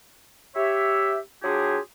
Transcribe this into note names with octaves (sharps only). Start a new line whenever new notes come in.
G4 C#5 E5
F#3 D4 F4 G4 G#4